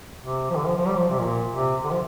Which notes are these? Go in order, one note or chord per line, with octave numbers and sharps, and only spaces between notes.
C3
F3
D3
F3
F3
G3
F3
C3
A#2
C3
D3
F3